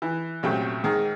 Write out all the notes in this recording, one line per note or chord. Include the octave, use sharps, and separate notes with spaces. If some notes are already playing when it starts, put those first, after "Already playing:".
E3
A#1 F#2 C3 A3 G5
G#2 D#3 G#4